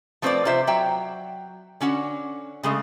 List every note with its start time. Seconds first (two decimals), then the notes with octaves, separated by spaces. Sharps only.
0.22 F3 A3 C4 A4 B4 D5
0.45 C3 F4 C5 E5
0.67 F#3 E5 G5
1.81 D3 C#4 F#4 F#5
2.63 C#3 G#3 A3